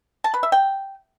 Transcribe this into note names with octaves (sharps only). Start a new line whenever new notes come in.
A5
B4
E5
G5